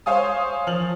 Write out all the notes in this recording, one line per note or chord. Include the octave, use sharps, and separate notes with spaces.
C5 C#5 F5 G#5 D#6
F3 F6 F#7